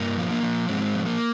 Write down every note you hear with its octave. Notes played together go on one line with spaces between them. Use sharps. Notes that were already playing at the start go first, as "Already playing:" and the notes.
Already playing: G2 A#3
F3
A#3
F3
G#2 G#3 C4
F3
A#3